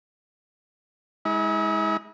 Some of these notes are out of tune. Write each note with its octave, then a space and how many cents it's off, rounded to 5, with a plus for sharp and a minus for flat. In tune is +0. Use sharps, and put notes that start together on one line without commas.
G#3 +0 E4 -40